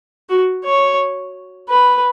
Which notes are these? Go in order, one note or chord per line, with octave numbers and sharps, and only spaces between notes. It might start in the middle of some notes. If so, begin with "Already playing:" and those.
F#4
C#5
B4